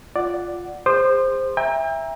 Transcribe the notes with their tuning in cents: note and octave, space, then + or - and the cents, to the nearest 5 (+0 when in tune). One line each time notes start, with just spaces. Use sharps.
F4 +0 D5 +0 F#5 +0
G#4 -35 C5 +0 D#6 -45
E5 +0 G5 +40 A#5 +15